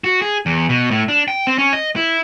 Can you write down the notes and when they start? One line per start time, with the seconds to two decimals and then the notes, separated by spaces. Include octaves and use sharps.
0.04 F#4
0.22 G#4
0.46 E2
0.69 B2
0.91 A2
1.08 D4
1.28 G5
1.47 C4
1.58 C#4
1.73 D#5
1.96 E4